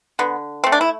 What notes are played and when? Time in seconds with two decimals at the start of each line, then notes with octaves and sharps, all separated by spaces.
0.19 D3 B3
0.64 A3 C4
0.72 D4
0.81 E4